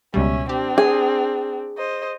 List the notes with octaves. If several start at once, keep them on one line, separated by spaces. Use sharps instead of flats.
C#2 B2 G3 C#4 E5
C4 D4 G4
G#4
C5 D#5